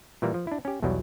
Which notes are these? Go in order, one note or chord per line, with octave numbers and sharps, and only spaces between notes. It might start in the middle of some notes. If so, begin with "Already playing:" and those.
A#2 E3 G3 A#3
F3
D4 E4
C#4 G4
B1 E2 B2 F#3 G3